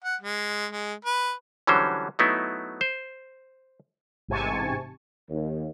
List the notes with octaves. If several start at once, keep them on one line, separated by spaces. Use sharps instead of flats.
F#5
G#3
G#3
B4
D3 E3 F#3 G3 C#4 C5
F#3 A3 B3 D#4 E4
C5
A1 G#2 C3 G#5 A5 C#6
D#2